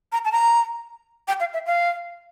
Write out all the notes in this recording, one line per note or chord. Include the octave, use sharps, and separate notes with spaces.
A#5
A5
A#5
G5
F5
E5
F5